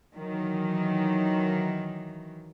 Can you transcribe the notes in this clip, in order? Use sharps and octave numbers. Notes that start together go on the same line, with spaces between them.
D#3 E3 F#3